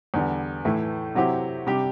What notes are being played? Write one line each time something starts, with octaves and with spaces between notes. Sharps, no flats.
E2 D3 G3
A2 E3 A3 E4
C3 F#3 C4 E4 G4
C3 G3 D4 G4